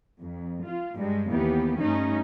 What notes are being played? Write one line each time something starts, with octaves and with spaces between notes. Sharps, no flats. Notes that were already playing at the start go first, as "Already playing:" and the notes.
F2
F4
G2 G3 G#3
D#2 E3 B3 G4
G2 A3 C#4 D#4